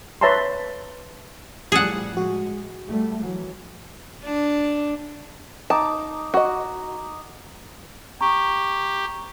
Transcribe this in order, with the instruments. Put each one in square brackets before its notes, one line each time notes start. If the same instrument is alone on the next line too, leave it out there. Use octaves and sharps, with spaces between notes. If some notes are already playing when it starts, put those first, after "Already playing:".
[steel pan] B4 C#5 E5 A5 A#5 C6
[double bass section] A2 F3 G3 [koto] G#4 A4 F#5
[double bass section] G#3 [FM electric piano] F#4
[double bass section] G3 A3
E3 F#3
[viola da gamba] D4
[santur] D#4 D6 [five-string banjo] A5
[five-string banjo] F#4 D#5
[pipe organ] G4 [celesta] A#5 C#6